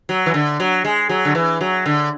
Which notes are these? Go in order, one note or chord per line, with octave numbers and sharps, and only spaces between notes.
F#3
E3
D3
F#3
G#3
F#3
D3
E3
F#3
D3